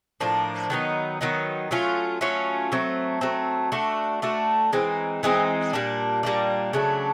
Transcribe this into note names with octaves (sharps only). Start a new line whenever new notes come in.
A2 F3 A#3 D4
D#3 F#3 B3 D#4
D#3 F#3 B3 D#4
F#3 A3 C#4 F4
F#3 A3 C#4 F4
F#3 A3 C4
F#3 A3 C4
A3 D4 F#4
A3 D4 F#4
E3 G#3 C4 D#4
E3 G#3 C4 D#4
A#2 G3 A#3 D4
A#2 G3 A#3 D4
C#3 F#3 A3 D4